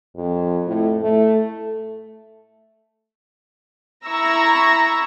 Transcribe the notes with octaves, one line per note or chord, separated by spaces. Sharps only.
F2
A2
A3
E4 A#5 C#6 E6 A#6